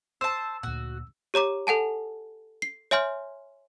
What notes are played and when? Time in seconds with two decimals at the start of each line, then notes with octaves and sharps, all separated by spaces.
0.21 C5 A5 E6
0.63 D2 A#2 F#4
1.34 G4 C#5 A#5 D6
1.67 A4 F#5 G#5 A5
2.62 C7
2.91 C#5 E5 G#5 C6 F6 G6